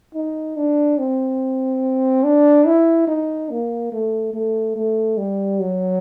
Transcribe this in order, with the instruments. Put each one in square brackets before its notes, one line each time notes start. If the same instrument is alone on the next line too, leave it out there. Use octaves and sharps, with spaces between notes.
[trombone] D#4
D4
C4
D4
E4
D#4
A#3
A3
A3
A3
G3
F#3